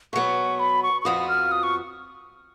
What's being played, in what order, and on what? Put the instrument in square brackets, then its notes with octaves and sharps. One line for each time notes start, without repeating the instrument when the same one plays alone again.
[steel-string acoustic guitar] B2 F#3 B3 [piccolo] C#6
[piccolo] B5
C#6
C#6
[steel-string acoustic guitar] F2 F3 B3 F#4 [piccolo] D#6
[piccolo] F6
D#6
C#6